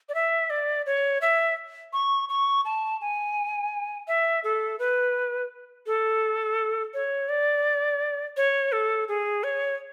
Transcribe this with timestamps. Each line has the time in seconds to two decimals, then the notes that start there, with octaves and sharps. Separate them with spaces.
0.09 D5
0.15 E5
0.50 D5
0.86 C#5
1.21 E5
1.93 C#6
2.29 C#6
2.65 A5
3.01 G#5
4.08 E5
4.44 A4
4.79 B4
5.86 A4
6.94 C#5
7.29 D5
8.37 C#5
8.72 A4
9.08 G#4
9.44 C#5